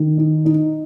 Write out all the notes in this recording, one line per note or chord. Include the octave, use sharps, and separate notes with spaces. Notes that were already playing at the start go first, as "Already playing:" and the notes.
Already playing: D#3
D#4
D#4